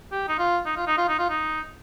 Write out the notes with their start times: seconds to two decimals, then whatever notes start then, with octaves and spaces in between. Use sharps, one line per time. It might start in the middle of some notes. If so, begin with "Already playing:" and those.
0.12 G4
0.28 D#4
0.39 F4
0.66 D#4
0.77 F4
0.87 D#4
0.98 F4
1.08 D#4
1.19 F4
1.29 D#4